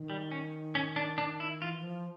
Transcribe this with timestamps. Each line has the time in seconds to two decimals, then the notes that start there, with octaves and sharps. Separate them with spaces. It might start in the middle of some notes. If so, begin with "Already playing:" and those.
Already playing: D#3
0.10 G3
0.31 C#4
0.75 C#4
0.96 D4
1.18 D4
1.40 E4
1.61 E3 F4
1.78 E3
1.83 F3